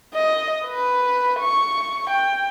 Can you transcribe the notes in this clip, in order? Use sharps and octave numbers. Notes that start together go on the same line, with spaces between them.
D#5
B4
C#6
G5